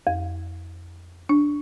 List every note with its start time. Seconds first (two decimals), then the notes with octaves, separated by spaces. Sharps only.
0.07 F2
1.29 D4